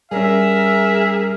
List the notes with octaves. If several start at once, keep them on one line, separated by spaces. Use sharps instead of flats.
G3 C#4 G#4 A#4 E5